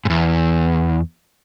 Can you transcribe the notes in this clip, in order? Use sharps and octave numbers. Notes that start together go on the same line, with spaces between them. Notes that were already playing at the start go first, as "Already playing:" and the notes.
E2 G#2